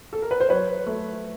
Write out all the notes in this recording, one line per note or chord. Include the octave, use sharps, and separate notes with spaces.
A4
A#4
B4
C5
F#3 B4 C#5
A3